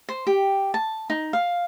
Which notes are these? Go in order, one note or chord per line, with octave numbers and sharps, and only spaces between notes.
C5
G4
A5
D#4
F5